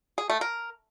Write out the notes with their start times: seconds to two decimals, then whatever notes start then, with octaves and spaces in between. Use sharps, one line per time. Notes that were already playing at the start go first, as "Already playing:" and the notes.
0.18 G#4
0.30 A3
0.41 A#4